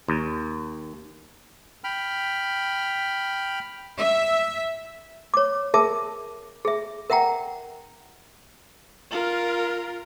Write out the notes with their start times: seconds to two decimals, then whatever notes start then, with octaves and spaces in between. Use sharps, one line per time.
0.08 D#2
1.84 G5 B5 F6
3.97 E5
5.34 C#5 D6
5.74 G#4 A#4 E5 A5 D6
6.65 G#4 E5
7.10 A#4 E5 F#5 G5 A#5
9.11 F4 A#4